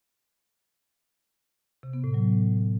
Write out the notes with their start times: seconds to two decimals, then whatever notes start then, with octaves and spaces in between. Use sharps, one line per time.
1.83 C3
1.93 B3
2.04 A2
2.14 F#3